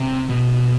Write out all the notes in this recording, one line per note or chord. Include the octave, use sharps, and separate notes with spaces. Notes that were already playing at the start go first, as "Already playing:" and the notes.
Already playing: C3
B2